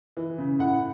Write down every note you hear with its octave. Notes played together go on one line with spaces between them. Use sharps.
E3
C#3
A2 F#5